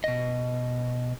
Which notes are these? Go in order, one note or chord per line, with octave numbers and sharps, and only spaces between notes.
B2 D#5